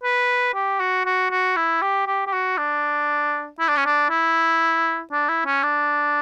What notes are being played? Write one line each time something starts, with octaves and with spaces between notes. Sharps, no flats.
B4
G4
F#4
F#4
F#4
E4
G4
G4
G4
F#4
D4
E4
D4
C#4
D4
E4
D4
E4
C#4
D4